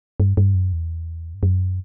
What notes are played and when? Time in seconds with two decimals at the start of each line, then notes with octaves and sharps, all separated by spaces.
0.20 G2
0.37 G2
0.54 F#2
0.73 E2
1.34 G2
1.43 F#2